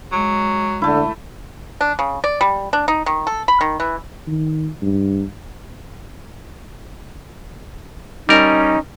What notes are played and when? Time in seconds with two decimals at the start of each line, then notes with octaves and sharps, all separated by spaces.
0.12 F#3 G#3
0.82 D3 A3 E4
1.81 D4
1.99 C#3
2.24 D5
2.41 G3
2.73 D4
2.88 D#4
3.06 D#3
3.27 A4
3.48 B5
3.61 D#3
3.80 E3
4.27 D#3
4.82 G2
8.29 G3 C#4 D#4 A#4